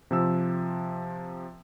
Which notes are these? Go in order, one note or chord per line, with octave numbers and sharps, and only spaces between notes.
C3 F3 E6